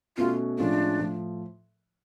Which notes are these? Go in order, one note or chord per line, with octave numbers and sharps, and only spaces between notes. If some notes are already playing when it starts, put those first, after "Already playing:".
B2 A3 C#4 F4 F#4
A2 F3 G#3 C#4 D4 F4
A2 F3